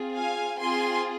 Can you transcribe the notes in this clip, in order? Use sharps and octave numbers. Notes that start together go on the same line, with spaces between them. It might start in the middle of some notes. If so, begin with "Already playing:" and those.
Already playing: C4 F4 G#4
F5 G#5
C4 F4 G#4 G#5 C6